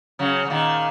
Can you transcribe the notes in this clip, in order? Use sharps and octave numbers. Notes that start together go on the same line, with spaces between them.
C#3 F#3
F#3
A#2 D#3